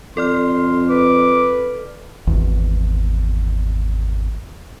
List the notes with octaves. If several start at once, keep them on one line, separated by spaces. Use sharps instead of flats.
F2 A4 D5 C6 F6
B4 D6
G#1 E2